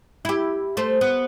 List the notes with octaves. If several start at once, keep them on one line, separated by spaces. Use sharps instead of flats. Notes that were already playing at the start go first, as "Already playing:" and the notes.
E4 G4
A3 C5
B3